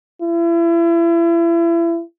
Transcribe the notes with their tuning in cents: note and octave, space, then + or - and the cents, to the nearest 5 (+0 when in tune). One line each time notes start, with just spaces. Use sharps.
E4 +35